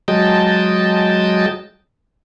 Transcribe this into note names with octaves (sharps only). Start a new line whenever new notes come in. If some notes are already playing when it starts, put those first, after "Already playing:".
F#3 G#3 D#5 G5 A5